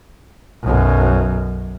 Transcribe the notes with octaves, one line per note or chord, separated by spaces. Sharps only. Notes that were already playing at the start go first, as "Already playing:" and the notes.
B1 F#2